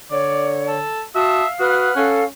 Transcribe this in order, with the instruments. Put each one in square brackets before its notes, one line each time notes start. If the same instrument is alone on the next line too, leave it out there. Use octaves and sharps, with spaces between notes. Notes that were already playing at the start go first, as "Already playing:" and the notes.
[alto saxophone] D3 [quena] C#5 [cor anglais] D5
[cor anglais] A4
[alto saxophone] F#4 [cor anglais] E5 [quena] F5 [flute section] A5 D#6
[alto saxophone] F#4 [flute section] B4 D#6 F6 [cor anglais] F#5
[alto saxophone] C#4 [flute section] A4 F5